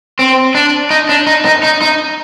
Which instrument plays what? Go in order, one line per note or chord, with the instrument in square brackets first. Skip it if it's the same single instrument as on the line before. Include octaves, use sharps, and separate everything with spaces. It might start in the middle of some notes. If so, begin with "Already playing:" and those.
[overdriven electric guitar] C4
D4
D#4
D4
D#4
D#4
D#4
D#4